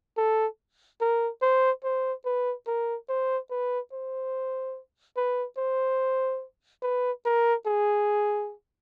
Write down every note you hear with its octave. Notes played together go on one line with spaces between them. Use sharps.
A4
A#4
C5
C5
B4
A#4
C5
B4
C5
B4
C5
B4
A#4
G#4